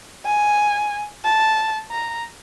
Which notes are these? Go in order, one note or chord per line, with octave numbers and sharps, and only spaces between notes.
G#5
A5
A#5